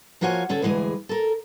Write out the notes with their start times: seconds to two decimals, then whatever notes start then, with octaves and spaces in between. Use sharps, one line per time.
0.21 F3 A#3 F4 F#4 C#5 G#5
0.49 D3 C#4 G#4 A4
0.62 D2 G2 E3 G#3 G#4 G#5
1.09 A4 A#4